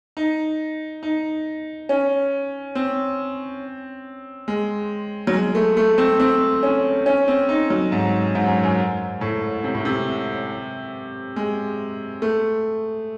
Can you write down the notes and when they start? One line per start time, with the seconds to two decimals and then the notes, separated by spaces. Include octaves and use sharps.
0.17 D#4
1.03 D#4
1.89 C#4
2.75 C4
4.48 G#3
5.27 F#3
5.33 G#3
5.55 A3
5.77 A3
5.98 C4
6.20 C4
6.63 C#4
7.06 C#4
7.28 C4
7.49 D#4
7.70 F#3
7.92 G#2
8.35 G#2
8.44 F#2
8.63 F#2
9.21 A2
9.64 C3
9.75 A2
9.85 C3
11.36 G#3
12.22 A3